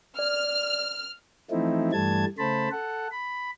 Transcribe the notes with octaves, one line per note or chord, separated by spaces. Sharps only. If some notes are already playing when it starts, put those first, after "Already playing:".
D5 F6
E3 F3 A3 C4 D#4 E4
G2 E3 G3 A3 A5 G#6
C#3 A3 C5 A5 B5
A4 F#5
B5